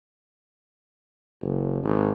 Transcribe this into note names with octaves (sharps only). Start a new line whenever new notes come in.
F#1
G#1